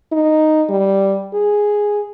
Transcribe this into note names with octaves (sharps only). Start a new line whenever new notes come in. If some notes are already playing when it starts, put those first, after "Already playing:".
D#4
G3
G#4